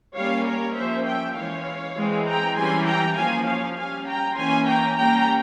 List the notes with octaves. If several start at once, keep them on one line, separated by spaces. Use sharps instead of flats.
G3 A#3 C#4 C#5 F5
A#4 C#5
F3 A#3 C#4 C5 E5
E5 G5
E3 G#3 C#4 C#5 F5
E3 G#3 C4
G5 A#5
E3 G3 C#4 G#5 C6
G5 A#5
F3 A#3 C#4 F5 G#5
C#5 F5
G3 C#4 F5 G#5
G5 A#5
E3 A#3 C#4 G#5 C6
G5 A#5
G3 A#3 C#4 G5 A#5